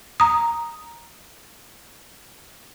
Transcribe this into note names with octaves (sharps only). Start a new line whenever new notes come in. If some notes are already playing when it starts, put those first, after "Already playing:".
A#5 D#6